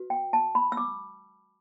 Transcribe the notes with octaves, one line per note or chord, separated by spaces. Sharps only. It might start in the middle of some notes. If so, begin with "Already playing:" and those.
Already playing: F#4 B4
G5
A5
B5
E6
D6